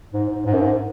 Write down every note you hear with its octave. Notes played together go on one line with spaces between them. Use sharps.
G#2
G#2
G#2
F#2
G#2